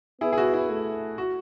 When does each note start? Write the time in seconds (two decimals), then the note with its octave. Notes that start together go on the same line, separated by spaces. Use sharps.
0.21 B3 E4 G#4
0.33 G#4
0.38 F#4
0.54 E4
0.70 A3
1.18 F#4